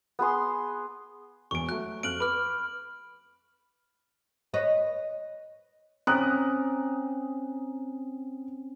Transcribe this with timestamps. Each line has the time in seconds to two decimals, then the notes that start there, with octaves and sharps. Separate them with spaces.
0.19 B3 G#4 C6
1.51 E1 E2 C#6 D7
1.69 F#3 A3 F#6
2.03 F2 F6 F#6 D7 F#7
2.20 B4 B5 D6 F6
4.54 B4 C#5 D#5
6.07 C4 C#4 A#5 D#6 F#6